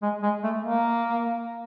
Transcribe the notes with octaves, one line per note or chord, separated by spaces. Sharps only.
G#3
G#3
A3
A#3